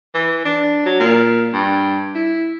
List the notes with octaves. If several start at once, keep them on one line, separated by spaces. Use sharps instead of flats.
E3
D4
F#3
A#2
G2
E4